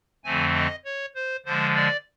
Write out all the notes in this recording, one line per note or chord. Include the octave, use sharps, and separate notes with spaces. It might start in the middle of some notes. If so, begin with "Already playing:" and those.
F2 D3 F3 A3 C4 G#5
D#5
C#5
C5
D3 F3 G#3 C5
D5